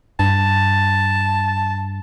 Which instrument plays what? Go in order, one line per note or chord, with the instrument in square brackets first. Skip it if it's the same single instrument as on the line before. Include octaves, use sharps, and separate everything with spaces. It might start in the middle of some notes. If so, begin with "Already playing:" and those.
[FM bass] G2 [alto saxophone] A5